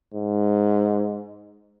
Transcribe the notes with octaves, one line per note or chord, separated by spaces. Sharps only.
G#2